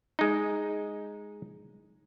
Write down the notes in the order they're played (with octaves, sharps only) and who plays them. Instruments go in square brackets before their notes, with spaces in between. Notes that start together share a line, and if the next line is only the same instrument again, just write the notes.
[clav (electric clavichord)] G#3 D#4